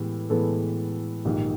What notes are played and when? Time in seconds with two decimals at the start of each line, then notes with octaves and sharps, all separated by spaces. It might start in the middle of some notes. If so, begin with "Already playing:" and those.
Already playing: A2 E3 G#3 B3 G4
0.30 A2 E3 G#3 B3 A4
1.25 A#1 G#2 D#3 G4